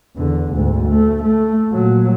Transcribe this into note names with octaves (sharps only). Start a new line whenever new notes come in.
E2 D3
D2 G#2
A3
A3
A#2 F#3